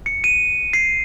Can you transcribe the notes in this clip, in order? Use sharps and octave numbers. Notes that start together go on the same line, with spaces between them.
C#7
D#7
C7